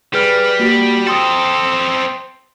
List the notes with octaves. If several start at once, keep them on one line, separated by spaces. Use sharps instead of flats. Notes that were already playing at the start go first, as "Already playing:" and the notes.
G3 G#4 B4 F6
A#3 F#4 G4
C4 A4 G5 C6 D#6